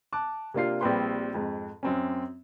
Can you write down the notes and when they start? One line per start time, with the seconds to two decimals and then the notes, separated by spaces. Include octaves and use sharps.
0.13 A5 D6 F#6
0.54 C3 A#3 D4 F4 C7
0.81 A#1 G3 C4 G4 B4 C6
1.34 F2 G#2
1.83 F#2 C4 C#4